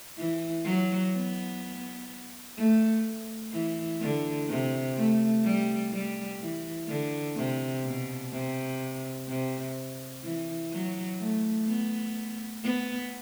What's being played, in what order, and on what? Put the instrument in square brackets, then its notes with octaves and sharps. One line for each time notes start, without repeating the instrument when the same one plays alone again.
[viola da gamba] E3
F#3
B3
A3
E3
D3
C3
A3
G3
G3
E3
D3
C3
B2
C3
C3
E3
F#3
A3
B3
B3